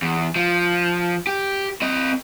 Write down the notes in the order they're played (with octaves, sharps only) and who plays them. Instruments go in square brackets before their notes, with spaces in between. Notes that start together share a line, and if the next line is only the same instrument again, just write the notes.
[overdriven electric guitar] E2
F3
G4
C4 D#5